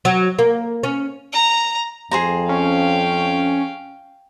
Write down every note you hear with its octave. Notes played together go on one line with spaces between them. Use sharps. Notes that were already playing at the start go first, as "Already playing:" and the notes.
F#3
A#3
C#4
A#5
F2 G#4 C5 A#5
C#4 F5 G5